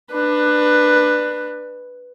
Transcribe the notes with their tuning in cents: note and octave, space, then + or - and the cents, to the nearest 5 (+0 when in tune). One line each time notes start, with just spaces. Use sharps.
D4 +25 B4 +0